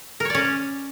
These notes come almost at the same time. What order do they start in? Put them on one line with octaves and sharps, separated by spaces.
A#4 C#5 D5 C#4